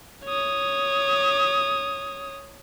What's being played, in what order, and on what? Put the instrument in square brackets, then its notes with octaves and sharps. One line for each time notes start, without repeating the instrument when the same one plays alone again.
[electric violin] C#5 D#6